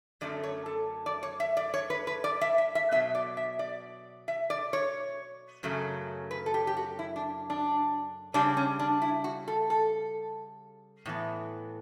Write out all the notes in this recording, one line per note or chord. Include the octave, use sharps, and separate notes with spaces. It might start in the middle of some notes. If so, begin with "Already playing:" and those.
F#2 D3 F#3 A3 C#4 D5
C#5
A4
D5
C#5
E5
D5
C#5
B4
B4
D5
E5
E5
E5
B2 F#3 B3 E5
D5
E5
D5
E5
D5
C#5
F#2 C#3 F#3 A3 C#4
B4
A4
G4
G4
F#4
E4
D4
D4
C#3 G3 C#4 D4
C#4
D4
E4
F#4
A4
A4
A2 E3 B3